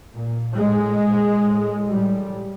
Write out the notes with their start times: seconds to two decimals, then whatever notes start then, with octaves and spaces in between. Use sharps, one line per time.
0.13 A#2
0.56 A2 G#3
1.00 A#2
1.45 A2
1.88 A2 G3